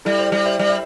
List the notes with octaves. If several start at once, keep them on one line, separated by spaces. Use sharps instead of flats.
G3 E4 A4
G4 C5
G3
C5 E5
G3 D5
E5